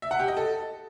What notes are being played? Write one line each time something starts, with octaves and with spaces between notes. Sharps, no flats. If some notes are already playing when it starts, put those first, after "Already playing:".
E5
F#5
G4
D#5
A4